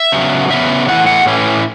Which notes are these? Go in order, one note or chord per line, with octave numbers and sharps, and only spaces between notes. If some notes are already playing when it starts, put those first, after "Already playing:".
Already playing: E5
C#3 F#3 B3
C#3 F#3 B3 E5
A2 E3 C#4 E4 F#5
F#5
A2 E3 C#4 E4